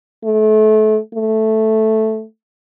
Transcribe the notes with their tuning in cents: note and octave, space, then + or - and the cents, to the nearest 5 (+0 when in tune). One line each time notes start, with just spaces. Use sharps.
A3 -30
A3 -5